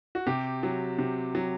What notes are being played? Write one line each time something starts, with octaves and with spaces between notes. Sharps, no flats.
F#4
C3 G4
F#3
C3
F#3